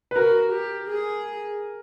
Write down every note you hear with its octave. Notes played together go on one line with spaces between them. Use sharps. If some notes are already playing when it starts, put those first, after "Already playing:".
B4
F#4 A#4
G4
G#4